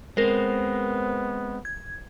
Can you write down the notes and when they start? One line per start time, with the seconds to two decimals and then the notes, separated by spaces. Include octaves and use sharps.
0.17 G#3 B3 C4 A#4 C5
1.65 G#6